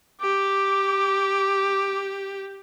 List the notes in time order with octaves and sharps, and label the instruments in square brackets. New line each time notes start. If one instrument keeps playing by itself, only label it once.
[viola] G4 [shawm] D6